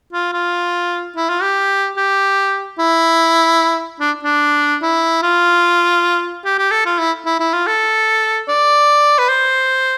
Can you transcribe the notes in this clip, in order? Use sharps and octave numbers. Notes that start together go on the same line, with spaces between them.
F4
F4
E4
F4
G4
G4
E4
D4
D4
E4
F4
G4
G4
A4
F4
E4
E4
E4
F4
A4
D5
B4
C5